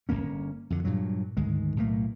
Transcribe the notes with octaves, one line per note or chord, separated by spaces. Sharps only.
G1 A2 A#3 C#4
F2 D3
G2 A#2 F#3
D2 G#2 D#3 G#3
B1 A2 A3 A#3